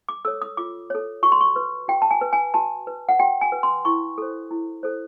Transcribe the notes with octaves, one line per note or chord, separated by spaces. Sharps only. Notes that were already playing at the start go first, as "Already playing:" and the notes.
D6
A4 C#5 E6
D#6
F4 D6
A4 C#5
F#4 C#6
C6
C#6
B4
F#4 G5
A5
G#5
B4
G#5
F#4 A5
B4
F#5
F#4 G5
G#5
B4
C6
E4 C#6
A4 C5
E4
A4 C5